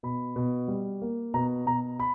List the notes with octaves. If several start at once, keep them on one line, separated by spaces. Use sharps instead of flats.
B2 B5
B2
G3
A#3
B2 A#5
B2 A#5
B5